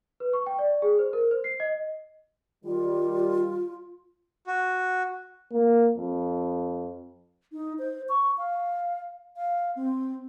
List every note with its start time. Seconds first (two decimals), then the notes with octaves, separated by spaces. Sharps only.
0.20 B4
0.33 C#6
0.46 G5
0.59 D5
0.82 G#4
0.99 C5
1.13 A#4
1.31 C5
1.44 C7
1.60 D#5
2.65 D#3 G3 F4
4.47 F#4
5.52 A#3
5.97 F2
7.52 D#4
7.79 C5
8.09 C#6
8.38 F5
9.36 F5
9.76 C4